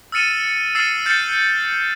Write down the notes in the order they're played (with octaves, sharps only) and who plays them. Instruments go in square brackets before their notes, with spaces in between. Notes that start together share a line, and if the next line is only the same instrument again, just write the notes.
[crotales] E6 F6 A6 C#7 D#7 E7
E6 F6 A6 C7 D#7 E7
F6 G6 A6 C7 C#7 E7